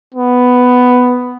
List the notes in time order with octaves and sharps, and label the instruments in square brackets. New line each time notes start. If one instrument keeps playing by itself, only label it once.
[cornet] B3